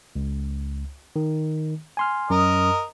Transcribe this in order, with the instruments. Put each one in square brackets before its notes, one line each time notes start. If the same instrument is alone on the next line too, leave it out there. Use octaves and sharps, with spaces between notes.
[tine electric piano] C#2
D#3
G#5 C6 F6
[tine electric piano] F#2 [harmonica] A#4 D#5